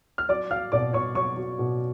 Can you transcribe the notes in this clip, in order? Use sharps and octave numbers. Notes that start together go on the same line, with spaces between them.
F6
F#3 D5 D6
F#3 F5 F6
B2 D5 D6
B2 C#5 C#6
F#3 C#5 C#6
F#3
B2